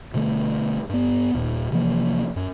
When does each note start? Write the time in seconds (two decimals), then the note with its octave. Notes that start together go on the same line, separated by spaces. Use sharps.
0.14 B2 D3 A3
0.89 G2 B3
1.35 D#1 A#2
1.72 C3 E3 F3 A#3
2.36 F#2